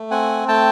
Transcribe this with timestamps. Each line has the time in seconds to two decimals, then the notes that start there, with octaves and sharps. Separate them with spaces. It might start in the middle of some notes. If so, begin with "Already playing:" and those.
Already playing: A3
0.11 C4 F#5 G#5
0.48 A3 G5 A5